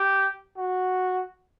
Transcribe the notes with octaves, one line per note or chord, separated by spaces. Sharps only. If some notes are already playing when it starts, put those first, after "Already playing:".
Already playing: G4
F#4